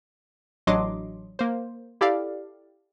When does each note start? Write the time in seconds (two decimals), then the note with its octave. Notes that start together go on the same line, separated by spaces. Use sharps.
0.67 A1 F#3 D4 D#5 C6 D6
1.39 A#3 C5
2.01 E4 G4 A4 D5 F5